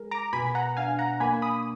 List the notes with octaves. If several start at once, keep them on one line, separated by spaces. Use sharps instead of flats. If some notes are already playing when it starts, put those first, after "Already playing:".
Already playing: G#3 A#4
A#5 D6
B2 G#5 B5
F#5 A#5
D4 F5 G#5
F#5 A#5
A#3 G#5 B5
B5 D#6